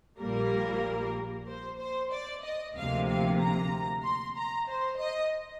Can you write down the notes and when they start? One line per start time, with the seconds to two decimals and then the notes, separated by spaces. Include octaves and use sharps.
0.19 A#1 A#2 G3 A#3 A#4
1.47 C5
1.79 C5
2.11 D5
2.43 D#5
2.75 D2 C3 F3 A#3 F5
3.08 F5
3.39 A#5
4.03 C6
4.36 A#5
4.68 C5
4.99 D#5